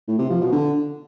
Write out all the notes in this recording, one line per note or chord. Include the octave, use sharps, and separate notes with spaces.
A2
C3
F3
B2
D3